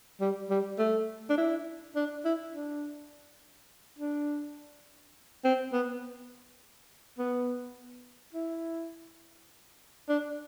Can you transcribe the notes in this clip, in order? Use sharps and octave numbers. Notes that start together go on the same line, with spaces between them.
G3
G3
A3
D4
E4
D4
E4
D4
D4
C4
B3
B3
E4
D4